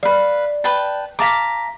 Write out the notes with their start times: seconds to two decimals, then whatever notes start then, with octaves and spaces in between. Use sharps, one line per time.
0.03 B4 D5 F5
0.64 B4 G5 A5
1.19 F5 A5 A#5 D6 A#6 B6